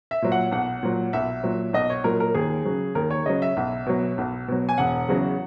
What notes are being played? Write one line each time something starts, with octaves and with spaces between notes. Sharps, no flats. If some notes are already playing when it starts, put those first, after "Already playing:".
E5
A#2 F#3
F#5
B1 F#5
A#2 F#3
B1 E5
A#2 F#3
B1 D#5
C#5
A#2 F#3 A#4
A#4
D#2 G#4
C#3 F#3
D#2 A#4
C#5
C#3 F#3 D#5
E5
B1
B2 F#3
B1
B2 F#3
G#5
E1 F#5
E2 C#3 F#3